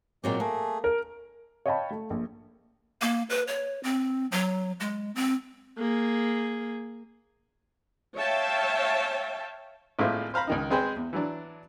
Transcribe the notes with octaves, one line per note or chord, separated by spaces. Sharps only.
A#2 F#3 G#3 C4 D5
A3 A#3 G#4
A#4
C#5 D#5 F5 G5 A5 B5
A3
A#1
A#3
B4
C#5
C4
F#3
G#3
C4
A#3 G#4
C#5 E5 F5 G5 A5
G#1 A2 A#3 F4 C5 E5
C5 F5 A#5 B5
C#2 D#3 D#4
G#3 C4 G#4 B4 C5 G5
E2
E3 F#3 D4